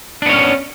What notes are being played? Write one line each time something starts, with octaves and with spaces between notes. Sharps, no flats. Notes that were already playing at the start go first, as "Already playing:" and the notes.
B3 C#4 D4 C#5